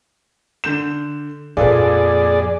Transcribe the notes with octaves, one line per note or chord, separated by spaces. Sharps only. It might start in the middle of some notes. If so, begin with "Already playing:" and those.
D3 G6 E7
F2 A#2 F4 G#4 A4 B4 D5